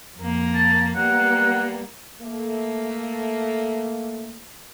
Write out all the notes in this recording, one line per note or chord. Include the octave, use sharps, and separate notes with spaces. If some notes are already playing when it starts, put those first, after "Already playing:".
F2 A#3
A5
G3 A#3 B3 F#5
A3 A#3